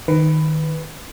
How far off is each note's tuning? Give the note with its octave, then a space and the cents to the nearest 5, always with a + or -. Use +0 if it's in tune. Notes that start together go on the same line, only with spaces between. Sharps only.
D#3 +0 B4 +10